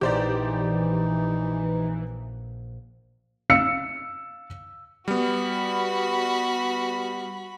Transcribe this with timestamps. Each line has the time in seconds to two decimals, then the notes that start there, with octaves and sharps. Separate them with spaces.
0.01 A#1 E3 D#4 G4 C5 D5
3.50 F5 E6 C#7
5.08 G3 B3 F#4 B5